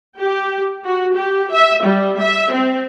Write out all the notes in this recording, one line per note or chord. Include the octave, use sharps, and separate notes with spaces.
G4
F#4
G4
E5
G3
E5
C4